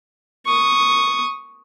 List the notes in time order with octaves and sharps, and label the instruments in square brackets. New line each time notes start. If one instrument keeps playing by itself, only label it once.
[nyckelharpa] C#6 D#6